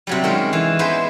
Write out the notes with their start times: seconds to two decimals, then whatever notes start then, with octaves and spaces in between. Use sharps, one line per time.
0.07 C3 F#3 G3
0.24 D#3 G#3 C#4
0.53 E3
0.79 G#3 B3 B4 C5